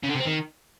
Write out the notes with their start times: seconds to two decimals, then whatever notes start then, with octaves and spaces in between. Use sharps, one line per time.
0.03 C#3
0.09 D3
0.14 C3
0.20 C4
0.25 D#3